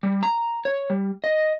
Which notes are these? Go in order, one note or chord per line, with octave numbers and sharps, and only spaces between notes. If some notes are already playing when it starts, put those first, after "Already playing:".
G3
A#5
C#5
G3
D#5